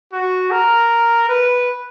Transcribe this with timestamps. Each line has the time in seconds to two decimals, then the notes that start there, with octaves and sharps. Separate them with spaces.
0.12 F#4
0.51 A#4
1.29 B4